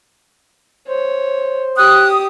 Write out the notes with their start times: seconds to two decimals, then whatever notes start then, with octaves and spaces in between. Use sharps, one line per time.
0.88 C5 C#5
1.78 G4 D#6 F#6